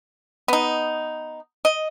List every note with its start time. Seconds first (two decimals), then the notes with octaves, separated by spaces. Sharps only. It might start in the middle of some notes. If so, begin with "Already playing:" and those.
0.48 B3 D#4
1.65 D#5